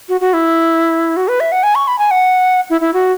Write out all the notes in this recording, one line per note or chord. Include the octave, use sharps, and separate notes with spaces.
F#4
F#4
E4
F#4
B4
E5
F#5
G#5
C#6
B5
G#5
F#5
E4
E4
F#4